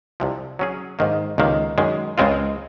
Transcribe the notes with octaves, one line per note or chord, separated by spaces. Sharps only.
C2 C3 F3
F#3 C#4 G#4
G#2 D#3 A#3
C#2 C3 D#3 A#3
F#2 D#3 G#3
C#2 C#3 G#3 C4 F4